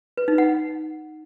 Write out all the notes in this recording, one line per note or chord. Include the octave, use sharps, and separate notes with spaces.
B4
D#4
F#5